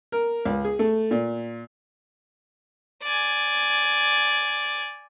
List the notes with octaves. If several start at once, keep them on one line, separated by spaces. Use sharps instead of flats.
A#4
C#2
G#4
A3
A#2
D5 G#5